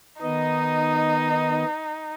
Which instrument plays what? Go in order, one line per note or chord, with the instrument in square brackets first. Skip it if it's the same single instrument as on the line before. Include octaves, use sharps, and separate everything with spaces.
[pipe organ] D#3 B3 D#5 [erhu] D#4